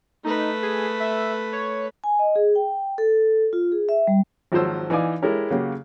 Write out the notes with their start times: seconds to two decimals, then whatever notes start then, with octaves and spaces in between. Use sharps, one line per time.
0.24 A3 D#4 B4
0.63 G#4
1.00 E5
1.53 C#5
2.04 G#5
2.19 D#5
2.36 G#4
2.55 G5
2.98 A4
3.53 F4
3.72 G#4
3.89 E5
4.07 G3
4.52 G#1 F3 F#3 C5 E6
4.90 E3 D#4 D5 F5 G#5 D6
5.22 G#3 E4 G4 A4 A#4 C#5
5.50 C#3 F#3 A#3 G4